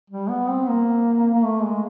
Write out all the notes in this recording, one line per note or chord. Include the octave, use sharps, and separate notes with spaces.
G3
B3
C4
A#3
A#3
A3
G#3